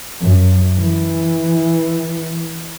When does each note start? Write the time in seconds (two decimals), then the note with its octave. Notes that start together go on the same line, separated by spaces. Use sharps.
0.22 F#2
0.76 E3